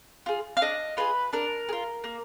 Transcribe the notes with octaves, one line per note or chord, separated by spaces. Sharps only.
F4 G#4
F5
D4 D#5
F4 G#4 B4
D4 A#4
G#4
F4
A#3